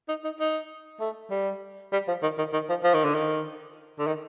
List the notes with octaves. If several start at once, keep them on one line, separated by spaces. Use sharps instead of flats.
D#4
D#4
D#4
A3
G3
G3
F3
D#3
D#3
D#3
F3
F3
D#3
D3
D#3
D3
D#3